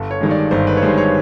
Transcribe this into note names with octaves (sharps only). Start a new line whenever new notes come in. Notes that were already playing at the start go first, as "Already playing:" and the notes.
Already playing: G1 A4
C#5
G2 D#3 G#3 C#5
D5
G1 C5
B4
C#5
G2 D#3 G#3 C5
C#5